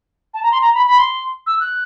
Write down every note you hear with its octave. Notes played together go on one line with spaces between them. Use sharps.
A5
A#5
C6
A#5
B5
B5
C6
E6
F#6